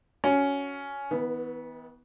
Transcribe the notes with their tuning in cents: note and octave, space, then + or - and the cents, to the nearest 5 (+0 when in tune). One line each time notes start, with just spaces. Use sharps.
C#4 +10 F#4 +0
E3 -45 B3 +0